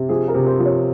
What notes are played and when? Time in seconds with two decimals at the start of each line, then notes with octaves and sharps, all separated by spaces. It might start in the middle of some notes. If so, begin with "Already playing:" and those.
Already playing: C3
0.09 F3 G#4
0.28 A#4
0.34 C3
0.47 C5
0.59 F3
0.65 C#5